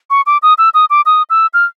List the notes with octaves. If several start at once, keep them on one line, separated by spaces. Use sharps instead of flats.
C#6
D6
D#6
E6
D#6
D6
D#6
E6
F6